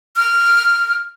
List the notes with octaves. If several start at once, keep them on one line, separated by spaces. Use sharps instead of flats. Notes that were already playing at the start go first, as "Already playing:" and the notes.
F6